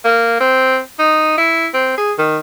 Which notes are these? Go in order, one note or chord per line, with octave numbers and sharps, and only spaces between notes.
A#3
C4
D#4
E4
C4
G#4
D#3